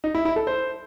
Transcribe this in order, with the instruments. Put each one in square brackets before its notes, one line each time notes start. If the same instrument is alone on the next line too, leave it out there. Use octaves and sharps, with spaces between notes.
[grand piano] D#4
E4
E4
A4
C5